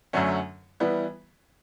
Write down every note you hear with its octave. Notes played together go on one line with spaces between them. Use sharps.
F#2 D3 F#3 A3 C#4
E3 G3 B3 E4